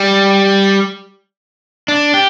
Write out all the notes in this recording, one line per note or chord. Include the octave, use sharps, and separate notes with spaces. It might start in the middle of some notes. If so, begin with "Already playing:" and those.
Already playing: G3
D4
G4